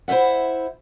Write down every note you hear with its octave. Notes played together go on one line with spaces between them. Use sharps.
E4 C5 C#5 E5 F#5